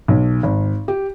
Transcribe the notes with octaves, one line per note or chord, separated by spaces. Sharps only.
B1
G#1
G4